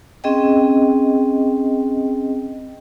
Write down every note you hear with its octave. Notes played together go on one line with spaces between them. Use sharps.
C4 C#4 G#4 D#5 G5